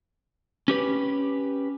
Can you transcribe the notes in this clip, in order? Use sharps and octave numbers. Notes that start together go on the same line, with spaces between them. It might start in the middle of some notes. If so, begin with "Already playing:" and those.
C#4 G4 B4